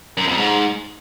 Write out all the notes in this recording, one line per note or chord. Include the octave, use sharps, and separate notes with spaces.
F#2
F2
G#2